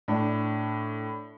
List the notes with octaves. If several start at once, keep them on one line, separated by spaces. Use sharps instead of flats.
A2 D4